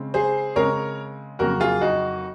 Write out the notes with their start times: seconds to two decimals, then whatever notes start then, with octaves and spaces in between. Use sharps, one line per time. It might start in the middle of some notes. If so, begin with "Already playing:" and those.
Already playing: C#3 G#3 C4
0.14 G#4 C5
0.56 C#3 G#3 C4 A#4 C#5
1.39 F2 C#3 F#3 A#3 F#4 A#4
1.60 F4 G#4
1.81 D#4 F#4